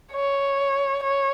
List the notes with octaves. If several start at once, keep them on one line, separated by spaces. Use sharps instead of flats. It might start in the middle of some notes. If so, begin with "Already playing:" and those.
C#5
C#5